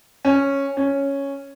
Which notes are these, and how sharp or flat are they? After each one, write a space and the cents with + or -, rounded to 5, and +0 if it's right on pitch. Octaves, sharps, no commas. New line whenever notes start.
C#4 -5
C#4 +0